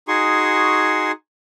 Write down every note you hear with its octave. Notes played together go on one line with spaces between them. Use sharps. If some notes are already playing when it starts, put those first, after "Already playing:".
D#4 F#4 G#4 G#5 C6 C#6